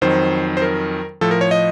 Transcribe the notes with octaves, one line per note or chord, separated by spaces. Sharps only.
F2 D#3 F#3 C5
C5
A#4
A2 F3 A4
A#4
C#5
D#5